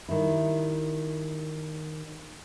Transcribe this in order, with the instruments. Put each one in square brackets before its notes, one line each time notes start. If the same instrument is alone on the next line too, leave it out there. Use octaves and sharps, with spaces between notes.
[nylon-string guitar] D#3 G3 E4